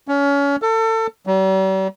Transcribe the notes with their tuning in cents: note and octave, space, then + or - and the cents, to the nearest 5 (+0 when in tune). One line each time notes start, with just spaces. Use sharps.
C#4 +30
A4 +30
G3 -45